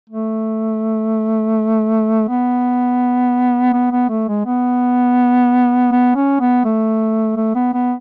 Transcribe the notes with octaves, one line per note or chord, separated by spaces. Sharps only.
A3
B3
B3
B3
A3
G#3
B3
B3
C#4
B3
A3
A3
B3
B3